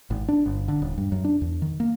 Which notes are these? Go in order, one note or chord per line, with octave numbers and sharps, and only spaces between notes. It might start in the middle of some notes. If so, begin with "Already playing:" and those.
G#1
D4
G1
D3
D#1
G2
F#2
D4
E2
D#3
A#3